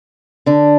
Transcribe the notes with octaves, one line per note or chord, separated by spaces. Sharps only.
D3 D4